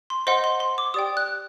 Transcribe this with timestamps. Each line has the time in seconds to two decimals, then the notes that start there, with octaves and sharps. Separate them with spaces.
0.10 C6
0.27 C5 D#5 F#5 C6
0.44 C6
0.60 C6
0.78 D6
0.94 G4 D5 G5 D#6
1.17 F#6